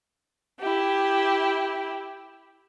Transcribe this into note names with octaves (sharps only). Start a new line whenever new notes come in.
E4 G4